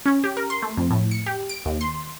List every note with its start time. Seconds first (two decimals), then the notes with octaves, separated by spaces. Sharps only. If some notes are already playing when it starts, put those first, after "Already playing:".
0.06 C#4
0.24 G4
0.37 A#4
0.50 C6
0.62 A3
0.77 F2
0.90 A2
1.11 C#7
1.26 G4
1.49 D7
1.66 D#2
1.81 C6